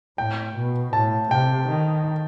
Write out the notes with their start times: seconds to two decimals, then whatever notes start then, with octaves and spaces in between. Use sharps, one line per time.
0.18 A2 G5
0.56 B2
0.93 A2 A5
1.31 C3 G5
1.69 D#3